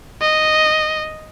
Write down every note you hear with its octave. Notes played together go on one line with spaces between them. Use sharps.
D#5